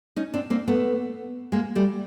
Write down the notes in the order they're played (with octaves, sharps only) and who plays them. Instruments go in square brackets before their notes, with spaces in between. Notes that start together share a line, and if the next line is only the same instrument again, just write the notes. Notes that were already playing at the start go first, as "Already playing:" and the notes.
[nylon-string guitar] C#4 D#4
C4 D4
A#3 C4
A3 B3
G#3 A#3
G3 A3